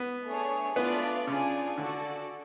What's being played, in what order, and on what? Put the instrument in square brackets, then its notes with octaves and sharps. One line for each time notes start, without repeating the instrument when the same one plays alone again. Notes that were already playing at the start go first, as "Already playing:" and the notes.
Already playing: [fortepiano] B3
[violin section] A3 D4 G#4 C#5
[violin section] A3 D4 F4 B4 D5 [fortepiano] B3
[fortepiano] C#3 [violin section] D4 F4 G#4 D5 G#5
[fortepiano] D3 [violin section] F#4 A4 D5